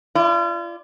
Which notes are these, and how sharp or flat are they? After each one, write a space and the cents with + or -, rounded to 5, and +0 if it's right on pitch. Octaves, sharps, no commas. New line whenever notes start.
F4 -40 D5 +0